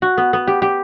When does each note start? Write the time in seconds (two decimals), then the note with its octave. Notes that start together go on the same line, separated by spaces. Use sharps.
0.02 F#4
0.18 B3
0.33 B3
0.47 G4
0.62 G4